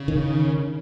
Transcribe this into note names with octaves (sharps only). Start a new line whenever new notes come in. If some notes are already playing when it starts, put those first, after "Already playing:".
Already playing: C#3
D#3